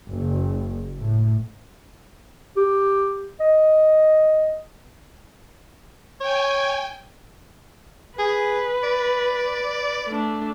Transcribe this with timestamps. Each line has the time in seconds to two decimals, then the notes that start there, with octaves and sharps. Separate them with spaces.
0.12 F#1
0.99 A2
2.57 G4
3.40 D#5
6.21 C#5 G5 G#5
8.19 G#4 B4
8.83 D5
10.07 A3 D4